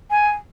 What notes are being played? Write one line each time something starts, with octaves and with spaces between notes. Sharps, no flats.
G#5